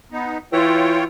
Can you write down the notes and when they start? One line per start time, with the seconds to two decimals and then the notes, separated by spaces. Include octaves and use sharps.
0.12 B3 D#4
0.53 E3 F4 C#5 G5